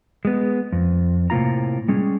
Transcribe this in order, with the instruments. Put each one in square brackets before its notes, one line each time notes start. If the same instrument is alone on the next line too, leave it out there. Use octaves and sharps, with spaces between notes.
[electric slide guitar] G#3 B3
F2
A2 C3 A#3 F4 A#5
G3 G#3 C#4